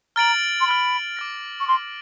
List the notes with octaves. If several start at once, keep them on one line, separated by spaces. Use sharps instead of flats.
A#5 F6 A6 D7 F#7
C6
B5 F6 A6 D7 F#7
D6 F6 A#6
C#6
C6 D6 F6 A#6